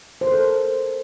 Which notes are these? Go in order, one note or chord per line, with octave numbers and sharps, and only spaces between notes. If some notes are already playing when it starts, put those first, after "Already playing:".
C5
A#4
A4